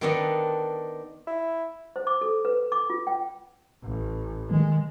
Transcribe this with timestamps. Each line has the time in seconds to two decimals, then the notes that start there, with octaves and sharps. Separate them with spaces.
0.01 D#3 B3 D4 A4 C#5 D#5
1.27 E4
1.96 C5
2.07 D6
2.21 A4
2.45 B4
2.72 D6
2.90 F4
3.07 G5
3.83 A1
4.51 D#3 G#3